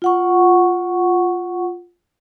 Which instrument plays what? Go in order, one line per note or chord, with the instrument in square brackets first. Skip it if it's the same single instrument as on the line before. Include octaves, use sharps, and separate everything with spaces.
[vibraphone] F4 F#5 C#6